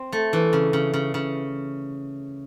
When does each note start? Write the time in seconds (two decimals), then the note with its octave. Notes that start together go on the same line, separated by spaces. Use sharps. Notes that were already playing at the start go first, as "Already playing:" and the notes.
Already playing: C4
0.12 A3
0.33 E3
0.53 C#3
0.73 C#3
0.93 C#3
1.14 C#3